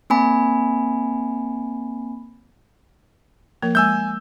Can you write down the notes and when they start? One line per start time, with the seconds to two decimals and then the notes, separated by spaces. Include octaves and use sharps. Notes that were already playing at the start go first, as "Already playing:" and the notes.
0.10 A#3 C4 G#5 B5
3.62 F3 A#3 A#4
3.75 G#3 G#5 E6 G6